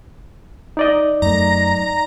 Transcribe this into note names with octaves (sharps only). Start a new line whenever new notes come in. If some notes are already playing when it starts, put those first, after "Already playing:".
D#4 D5 D#5
F#2 A3 A#5